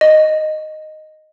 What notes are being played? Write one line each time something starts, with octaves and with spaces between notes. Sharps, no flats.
D#5